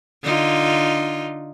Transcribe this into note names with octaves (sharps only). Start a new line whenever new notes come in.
D3 D#4 F4